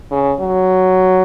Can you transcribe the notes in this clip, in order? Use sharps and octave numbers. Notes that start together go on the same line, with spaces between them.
C#3
F#3